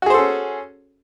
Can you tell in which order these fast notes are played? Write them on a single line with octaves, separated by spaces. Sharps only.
F#4 G#4 C5 A4 C#4